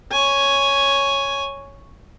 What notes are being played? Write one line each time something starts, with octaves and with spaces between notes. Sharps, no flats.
C#5 G#5